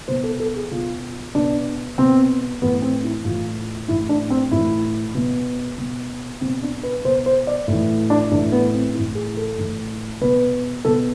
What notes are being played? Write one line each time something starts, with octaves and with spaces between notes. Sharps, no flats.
B2 C5
A4
A4
G#4
B2 F4
B2 D4
B2 C4
A2 E3 B3
C4
E4
A2 E3 F4
A2 E3 E4
D4
C4
A2 E3 E4
B2
B2
B2 C4
D4
B4
B2 C5
C5
D5
A2 E3
D4
A2 E3 D4
B3
C4
A2 E3 E4
G#4
A4
A2 E3
B2 B4
B2 A4